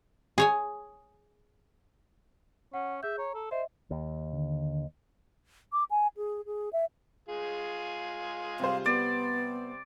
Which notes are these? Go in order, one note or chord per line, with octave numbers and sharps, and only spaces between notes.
G#4 C#5 G#5
C#4 F#5
G#4 E5 G6
C#5 A#5
A4
C5 D#5 E5
D#2
D3
D6
G#5
G#4
G#4
E5
G#3 F4 G#4
C3 G3 C5 F5
B3 D5